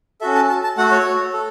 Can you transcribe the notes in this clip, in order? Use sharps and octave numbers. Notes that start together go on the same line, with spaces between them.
C#4 F#4 A4 E5
A5
A5
A5
A3 F#4 A4 F#5
C#5
A4